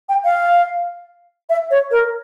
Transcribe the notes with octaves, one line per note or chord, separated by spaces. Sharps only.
G5
F5
E5
C#5
A#4